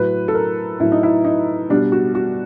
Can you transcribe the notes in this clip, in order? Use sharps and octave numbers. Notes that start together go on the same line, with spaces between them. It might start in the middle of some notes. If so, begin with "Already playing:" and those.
Already playing: A2 F#3 B4
A4
A#4
A2 F#3 E4
D#4
E4
D#4
B2 G3 D4
F#4
F#4